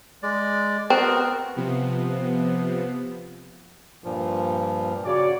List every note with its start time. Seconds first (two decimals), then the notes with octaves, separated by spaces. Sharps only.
0.23 G#3 D5
0.90 B3 C4 F#4 A#4
1.56 C3 F3 B3
4.04 G2 A#2 F3
5.05 C#3 F#4 C#5 D5